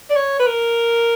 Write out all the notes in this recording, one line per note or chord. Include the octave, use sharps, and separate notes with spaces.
D5
C#5
B4
A#4